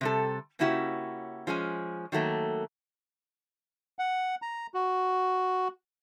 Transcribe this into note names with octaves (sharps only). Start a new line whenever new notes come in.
C3 G3 A4
C#3 A#3 C#4 E4 F#4 G4
F3 G#3 C#4 G#5
D#3 F#3 A3 A#3
F#5
A#5
F#4